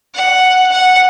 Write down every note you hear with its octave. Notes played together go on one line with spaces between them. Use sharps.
F#5
F#5